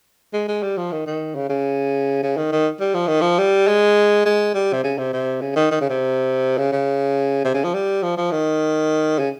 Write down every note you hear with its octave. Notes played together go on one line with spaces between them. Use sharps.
G#3
G#3
G3
F3
D#3
D#3
C#3
C#3
C#3
D#3
D#3
G3
F3
D#3
F3
G3
G#3
G#3
G3
C3
C#3
C3
C3
C#3
D#3
D#3
C#3
C3
C#3
C#3
C3
C#3
F3
G3
F3
F3
D#3
C#3